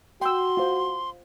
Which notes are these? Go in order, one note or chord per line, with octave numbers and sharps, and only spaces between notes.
F#4 G5 C6 E6
F4 C5